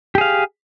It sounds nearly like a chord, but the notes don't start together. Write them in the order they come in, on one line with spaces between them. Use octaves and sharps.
G4 G#4 F5